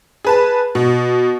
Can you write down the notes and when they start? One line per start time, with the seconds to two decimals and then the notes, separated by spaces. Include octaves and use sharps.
0.25 G#4 B4 A5
0.75 B2